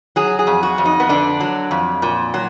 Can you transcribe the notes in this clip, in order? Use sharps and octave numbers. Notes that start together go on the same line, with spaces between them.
F#3 G#4
G#4
F2
F#4
F2
D#4
B3
D3 D4
F#3
F2
A#2
F#3